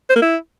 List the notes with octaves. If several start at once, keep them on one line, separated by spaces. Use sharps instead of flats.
C5
A#3
E4